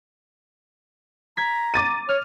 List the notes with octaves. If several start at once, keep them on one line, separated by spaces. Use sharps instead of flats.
A#5 G#6 B6
D6 A6 D#7
C#5 F6